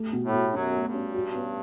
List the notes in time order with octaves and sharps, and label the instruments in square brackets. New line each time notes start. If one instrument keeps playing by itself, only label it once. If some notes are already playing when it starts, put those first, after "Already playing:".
Already playing: [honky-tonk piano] A3 G4
B2
[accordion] A2
[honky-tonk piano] B2
[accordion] F#2 F#3 [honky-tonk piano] C#4
[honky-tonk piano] A3
[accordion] G2
[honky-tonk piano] C#4
F#4
B3